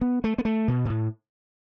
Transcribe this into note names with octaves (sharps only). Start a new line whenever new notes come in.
B3
A3
B3
A3
B2
B2
A2